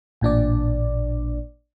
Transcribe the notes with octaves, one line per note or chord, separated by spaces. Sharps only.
A1 A#2 D4 D5